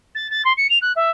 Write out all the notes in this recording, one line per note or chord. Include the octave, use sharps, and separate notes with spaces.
A6
A6
C6
C#7
F7
F#6
E5